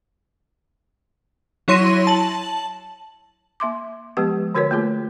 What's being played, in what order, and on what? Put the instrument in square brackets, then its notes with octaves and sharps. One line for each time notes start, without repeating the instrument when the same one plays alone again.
[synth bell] F#3 E4 C#5 C6 A#6 D#7
A5 F#7
[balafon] A#3 E5 C6 D6
F3 G#3 B3 G4 B4
D3 F#4 A#4 B4 C#5
A3 A#3 F4 G#4